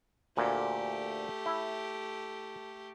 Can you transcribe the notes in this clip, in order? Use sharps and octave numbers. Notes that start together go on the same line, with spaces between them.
D2 A#2 A3 G4
E4